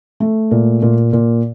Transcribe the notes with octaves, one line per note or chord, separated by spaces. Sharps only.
A3
A#2
A#2
A#2